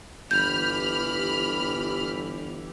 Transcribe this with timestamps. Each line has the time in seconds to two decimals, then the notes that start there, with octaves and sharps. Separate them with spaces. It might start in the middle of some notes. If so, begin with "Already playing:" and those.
0.31 G1 E3 G4 B5 F6 G6